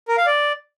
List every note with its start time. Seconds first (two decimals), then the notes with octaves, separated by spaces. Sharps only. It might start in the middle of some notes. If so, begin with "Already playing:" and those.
0.08 A#4
0.17 F5
0.27 D5